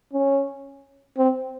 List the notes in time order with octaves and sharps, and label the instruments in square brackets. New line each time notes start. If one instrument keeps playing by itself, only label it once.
[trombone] C#4
C4